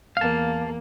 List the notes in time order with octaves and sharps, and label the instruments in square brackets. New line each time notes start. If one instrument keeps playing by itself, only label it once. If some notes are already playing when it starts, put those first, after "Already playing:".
[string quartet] E2 A#3 [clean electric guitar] F5 A5